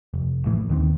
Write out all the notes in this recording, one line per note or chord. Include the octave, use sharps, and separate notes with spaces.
F1
A#1 A2 E3
D#2 D#3 B3 C4